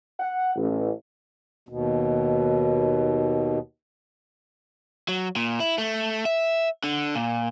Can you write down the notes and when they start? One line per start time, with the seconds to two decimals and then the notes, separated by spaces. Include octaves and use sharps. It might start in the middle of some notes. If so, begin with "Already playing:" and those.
0.20 F#5
0.56 A1
1.69 D#2 B2
5.08 F#3
5.36 A#2
5.60 E4
5.78 A3
6.25 E5
6.84 D3
7.15 A#2